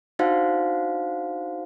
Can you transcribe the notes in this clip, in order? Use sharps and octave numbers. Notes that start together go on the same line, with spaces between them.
D4 D#4 F#4 C5 F5 F#5